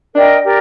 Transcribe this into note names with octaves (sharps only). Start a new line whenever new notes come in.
D4 A#4 D#5 G5
G4 A#4 D5